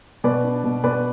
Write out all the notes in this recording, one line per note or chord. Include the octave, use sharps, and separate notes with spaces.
B2 B4 D5
D4
B2
B2 B4 D5